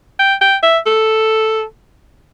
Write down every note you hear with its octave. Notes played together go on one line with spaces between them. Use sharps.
G5
G5
E5
A4